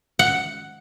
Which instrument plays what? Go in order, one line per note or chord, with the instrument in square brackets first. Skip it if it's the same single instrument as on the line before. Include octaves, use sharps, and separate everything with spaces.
[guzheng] F#5